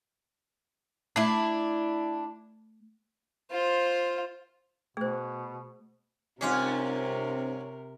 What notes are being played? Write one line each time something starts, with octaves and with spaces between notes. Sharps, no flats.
A3 D4 E4
F4 C5
B2 A3 G#4 C5
G2 C3 C4 C#4 F4 G4 G#4 A#4